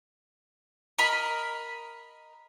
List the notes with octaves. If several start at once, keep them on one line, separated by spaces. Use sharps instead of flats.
A#4 D#5 B5